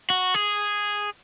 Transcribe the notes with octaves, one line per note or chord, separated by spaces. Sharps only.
F#4
G#4